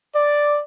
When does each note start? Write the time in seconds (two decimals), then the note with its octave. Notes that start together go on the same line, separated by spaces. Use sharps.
0.16 D5